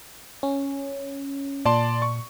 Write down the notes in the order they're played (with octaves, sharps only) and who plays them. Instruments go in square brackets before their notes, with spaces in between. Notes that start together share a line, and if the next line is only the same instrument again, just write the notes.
[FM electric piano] C#4
[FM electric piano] A#2 [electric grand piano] D5 A5 C6
[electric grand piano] C#6